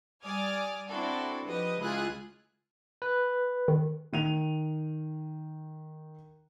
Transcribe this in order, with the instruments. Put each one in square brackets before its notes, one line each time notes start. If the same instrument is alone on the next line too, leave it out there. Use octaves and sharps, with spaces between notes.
[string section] G3 D5 G#5 D6 D#6 F6
C4 D4 E4 F#4 A4
F3 G4 B4 D#5
C#2 E4 F4 G#4 F#6
[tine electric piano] B4
[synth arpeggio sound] D#3
[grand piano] D#3 D#7 F7